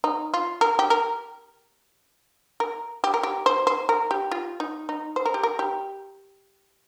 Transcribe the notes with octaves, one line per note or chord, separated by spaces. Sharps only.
D#4
F4
A#4
G4
A#4
A#4
G4
A#4
G4
C5
C5
A#4
G4
F4
D#4
D#4
C5
A#4
G4
A#4
G4